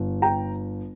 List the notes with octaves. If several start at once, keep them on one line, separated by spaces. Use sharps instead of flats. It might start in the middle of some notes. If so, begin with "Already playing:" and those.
Already playing: G1
G5 A#5